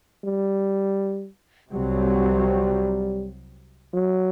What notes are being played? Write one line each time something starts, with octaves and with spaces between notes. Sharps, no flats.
G3
C2 C3 F#3 G3 C4
F#3